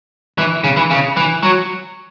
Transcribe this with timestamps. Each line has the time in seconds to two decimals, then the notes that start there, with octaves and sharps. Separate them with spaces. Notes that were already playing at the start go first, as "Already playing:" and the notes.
0.38 E3
0.64 C#3
0.77 E3
0.91 C#3
1.17 E3
1.43 F#3